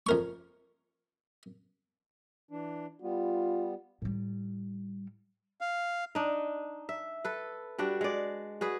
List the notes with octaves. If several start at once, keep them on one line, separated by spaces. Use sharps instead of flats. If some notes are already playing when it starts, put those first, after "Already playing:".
F2 A#4 C#6
E3 D4
G3 B3 F4
A2 G3
F5
D4 D#4
E5
A4 B4
G3 D4 F#4
G#3 D5
F#4 G#4 B4